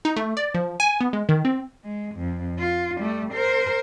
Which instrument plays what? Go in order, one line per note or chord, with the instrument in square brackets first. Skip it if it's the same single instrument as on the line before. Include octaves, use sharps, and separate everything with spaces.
[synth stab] D#4
A3
D5
F3
G#5
B3
G#3
D#3
C4
[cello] G#3
F2
F4
G3 A3
A#4 C5